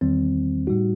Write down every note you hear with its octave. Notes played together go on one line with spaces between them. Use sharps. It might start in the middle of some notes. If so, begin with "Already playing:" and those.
E2 D#3 G3 C4
A2 G3 D#4 F#4